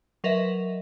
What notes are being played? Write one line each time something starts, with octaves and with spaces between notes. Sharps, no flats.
F#3 A#4 B4 D#5 E5